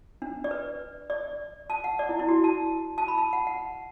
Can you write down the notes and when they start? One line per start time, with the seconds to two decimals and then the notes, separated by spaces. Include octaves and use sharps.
0.22 D4
0.44 D5
0.51 B4
1.10 D5
1.70 A5
1.84 F#5
1.99 D5
2.09 E4
2.19 E4
2.29 F#4
2.44 A5
2.98 A5
3.08 B5
3.18 A5
3.33 F#5
3.47 F#5